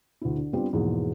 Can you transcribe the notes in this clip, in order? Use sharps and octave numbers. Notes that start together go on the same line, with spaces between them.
D2 E4
D3
G3 B3 C4 D4 F4 G4
E2 G#2 B2 F3 G#3 A#3